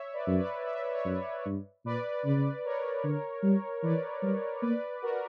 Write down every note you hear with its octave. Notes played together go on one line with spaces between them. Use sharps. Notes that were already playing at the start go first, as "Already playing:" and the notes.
Already playing: C#5 E5
B4 D5
F#2
B4 D5
E5
C#5 E5
F#2
G2
A#2 B4 D5
C#3 B4 D5
A#4 C#5
D3
G3
E3 B4 D5
G3
A#3 B4 D5
F#4 A#4